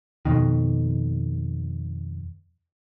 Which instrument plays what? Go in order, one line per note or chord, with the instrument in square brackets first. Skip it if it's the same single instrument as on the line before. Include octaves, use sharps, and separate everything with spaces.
[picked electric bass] F2 B2 D#3